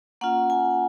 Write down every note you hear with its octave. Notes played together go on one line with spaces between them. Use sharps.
A#3 C#4 F4 F#5
G#5